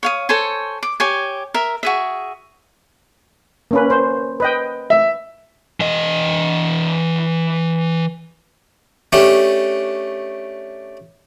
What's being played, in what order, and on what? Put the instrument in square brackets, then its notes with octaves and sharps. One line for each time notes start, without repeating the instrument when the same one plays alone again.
[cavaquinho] C#5 F5 D#6
A4 C5 C#5 G#5
D6
G4 C#5 G#5
A#4 E5
F#4 G#4 E5
[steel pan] A#3 C#4 B4
C5
B4 D#5 G5
[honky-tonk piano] E5
[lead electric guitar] E3 D#5
[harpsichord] A3 C#4 D4 G4